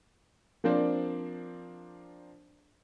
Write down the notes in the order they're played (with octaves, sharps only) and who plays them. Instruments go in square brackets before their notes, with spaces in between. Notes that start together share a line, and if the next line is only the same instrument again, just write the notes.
[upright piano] F3 A#3 C4 D4 C5 D5